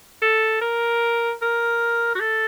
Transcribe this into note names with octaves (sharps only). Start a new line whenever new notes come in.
A4
A#4
A#4
F#4
A4